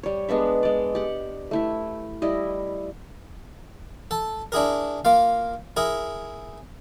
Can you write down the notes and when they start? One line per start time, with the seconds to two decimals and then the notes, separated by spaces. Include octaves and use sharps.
0.03 G3 C#5
0.29 G#3 B3 D4 E5
0.63 G#3 D5
0.95 G4 F#5
1.51 A3 E4 E5
2.22 G3 E4 D#5
4.11 A4 A5
4.52 D4 E4 G#4 A#4
5.05 A#3 F4 F5
5.77 E4 G#4 A#4